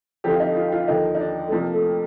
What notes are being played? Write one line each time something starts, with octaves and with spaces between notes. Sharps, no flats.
F2 D3 F3 G4
F4
D#4
F4
F4
D#2 D3 F3 D#4
D#4
D4
A3
F2 C3 F3 A#3
A3